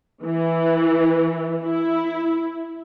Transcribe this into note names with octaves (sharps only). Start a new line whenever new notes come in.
E3
E4